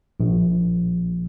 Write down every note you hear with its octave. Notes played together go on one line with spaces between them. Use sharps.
A#1